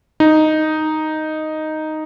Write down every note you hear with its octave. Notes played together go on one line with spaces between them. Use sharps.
D#4